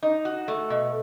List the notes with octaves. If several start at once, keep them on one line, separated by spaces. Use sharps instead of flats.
D#4
F#4
A3
B2